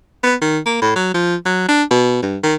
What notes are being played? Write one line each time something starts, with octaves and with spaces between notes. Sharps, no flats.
B3
D#3
A#3
A2
F#3
F3
F#3
D4
B2
G2
D#3